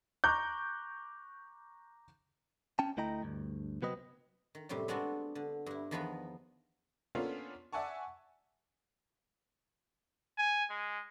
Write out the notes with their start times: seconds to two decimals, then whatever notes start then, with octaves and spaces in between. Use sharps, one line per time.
0.24 A#5 C#6 D6 F#6 G6
2.79 C#4 G5 A5
2.97 D2 A3 E4 D#5 G5 A#5
3.22 D2 G2
3.82 C3 F#3 B3 C4 B4 D#5
4.55 D#3
4.69 F#2 A2 C3 G3
4.88 G#3 B3 C4 D4 F#4 A4
5.35 D3
5.66 G2 E4
5.91 E2 D#3 F3 B3 D#5 B5
7.15 A#3 B3 C#4 D4 F4 A4
7.73 D5 E5 F#5 G#5 A5 C#6
10.38 G#5
10.70 G#3